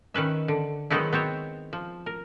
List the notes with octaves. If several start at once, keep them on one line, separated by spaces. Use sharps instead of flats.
D#3 C#4 B4 E5
D3
D#3 F#3 G#3 B3 D#4 E4
B3 C4 C5 C#5
F3
A#4